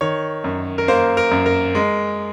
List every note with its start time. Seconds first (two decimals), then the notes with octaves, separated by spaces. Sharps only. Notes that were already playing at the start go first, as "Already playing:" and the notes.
0.01 D#3 C#5
0.44 F#2
0.78 A#4
0.88 A#3 C5
1.17 A#4
1.31 F#2
1.46 A#4
1.75 G#3